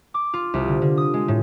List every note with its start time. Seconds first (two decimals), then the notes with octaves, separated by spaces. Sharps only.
0.14 D6
0.34 F4
0.54 C2
0.68 D3
0.82 D3
0.97 D#6
1.14 G#3
1.28 A2